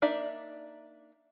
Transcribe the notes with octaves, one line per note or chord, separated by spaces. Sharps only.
A#3 D4 D#4 D5 E5